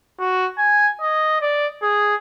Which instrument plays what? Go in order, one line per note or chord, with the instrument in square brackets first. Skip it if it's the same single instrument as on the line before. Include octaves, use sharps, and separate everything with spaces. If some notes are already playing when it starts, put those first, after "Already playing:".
[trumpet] F#4
G#5
D#5
D5
G#4